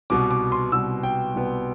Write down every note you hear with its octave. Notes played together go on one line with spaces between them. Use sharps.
C2 B2 B3 D6
D6
C6
C2 B2 B3 E6
G5
C2 B2 B3